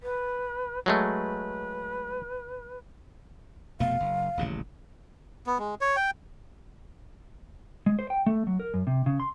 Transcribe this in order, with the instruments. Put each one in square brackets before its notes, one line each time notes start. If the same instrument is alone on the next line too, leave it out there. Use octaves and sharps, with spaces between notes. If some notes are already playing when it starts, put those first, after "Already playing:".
[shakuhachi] B4
[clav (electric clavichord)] F#3 G#3 A3 [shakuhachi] B4
[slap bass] F1 B2 A3 [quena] F5
[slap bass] F#1
D#1 A1 C#3
[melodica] B3
G#3
C#5
G5
[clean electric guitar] G#3
C5
G5
A3
F#3
A#4
F#2
C3
C#3
C6